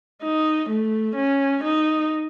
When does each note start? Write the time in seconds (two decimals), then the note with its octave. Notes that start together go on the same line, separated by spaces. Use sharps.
0.23 D#4
0.70 A3
1.16 C#4
1.64 D#4